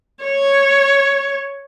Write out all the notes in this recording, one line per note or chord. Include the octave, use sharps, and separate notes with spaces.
C#5